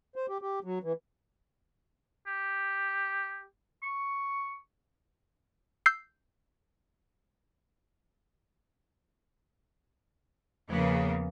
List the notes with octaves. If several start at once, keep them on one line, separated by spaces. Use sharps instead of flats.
C5
G4
G4
F#3
E3
G4
C#6
E6 G6 C7
E2 C#3 F3 A#3 B3